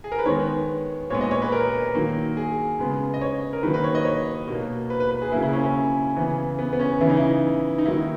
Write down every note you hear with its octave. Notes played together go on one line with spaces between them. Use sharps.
G#4
A#4
B4
D#3 G#3 B3 C#5
A#2 G#3 B3 C#5
D#5
C#5
B4
A#4
D#3 F#3 A#3
G#4
C#3 G#3 B3
D#5
C#5
A#4
D#3 F#3 A#3 B4
B4
C#5
D#5
C#5
B2 A#3
B4
B4
B4
G#4
C#3 F#3 A#3 E4
E4
C#4
C#4
C#3 E3 B3
B3
B3
C#4
C#3 E3 B3 E4
D#4
E4
D#4
D#3 F#3 A#3 E4